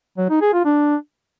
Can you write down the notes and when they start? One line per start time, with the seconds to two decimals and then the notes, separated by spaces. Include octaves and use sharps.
0.18 F#3
0.30 D#4
0.41 G#4
0.53 F4
0.65 D4